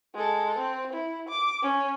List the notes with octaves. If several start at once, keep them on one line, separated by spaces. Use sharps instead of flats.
G#3 A4
C4
E4
D6
C#4